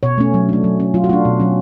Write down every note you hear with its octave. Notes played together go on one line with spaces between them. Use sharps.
B2 C#5
A3 C#4
F#3
A3 D4
F#3
C#4
F#3 F4
F#4
A3 D4 F4
B2
F#3 C#4